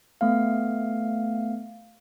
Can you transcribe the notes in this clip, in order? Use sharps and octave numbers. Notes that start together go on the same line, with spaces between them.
A3 B3 F5